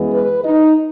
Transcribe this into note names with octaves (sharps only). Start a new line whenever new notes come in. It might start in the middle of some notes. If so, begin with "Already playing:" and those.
Already playing: F#2 E3 G#3 B3
B4
D#4